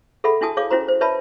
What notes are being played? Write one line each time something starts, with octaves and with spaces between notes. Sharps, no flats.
G#4 A4 E5 F#5 B5
D4 E4 F#4 G#5 A5 D#6
G#4 C#5 F5 D6
C#4 E4 F#4 C5 A#5
C5
B4 C#5 E5 A5 B5